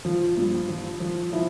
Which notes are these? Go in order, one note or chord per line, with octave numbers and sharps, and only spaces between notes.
F3 F4
G2
F3
F3
F3 E4